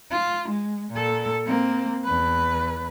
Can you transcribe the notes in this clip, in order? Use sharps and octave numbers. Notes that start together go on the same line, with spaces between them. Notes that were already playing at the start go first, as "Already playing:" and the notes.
F4
G#3
A#2 A4
A#3 C4
E2 B4